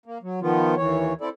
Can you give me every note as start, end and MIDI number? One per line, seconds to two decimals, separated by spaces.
0.06 0.18 58
0.23 0.40 54
0.42 0.75 51
0.42 0.75 53
0.42 0.75 59
0.42 0.75 65
0.77 1.13 39
0.77 1.13 52
0.77 1.13 73
1.21 1.29 60
1.21 1.29 64
1.21 1.29 69
1.21 1.29 74